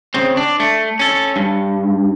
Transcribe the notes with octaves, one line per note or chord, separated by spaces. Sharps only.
C#3 C4
D4
A3
C#4 A4
G2